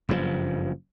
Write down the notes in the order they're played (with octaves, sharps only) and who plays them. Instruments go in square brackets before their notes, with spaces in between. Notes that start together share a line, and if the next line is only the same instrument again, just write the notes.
[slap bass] F#1 G2 A#2 F3